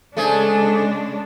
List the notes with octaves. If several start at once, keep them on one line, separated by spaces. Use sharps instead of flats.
C#3 G#3 A3 D4 G#4 C5